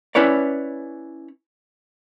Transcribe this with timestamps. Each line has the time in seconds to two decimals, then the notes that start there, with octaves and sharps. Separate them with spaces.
0.15 C#4 E4 B4 C#5 D5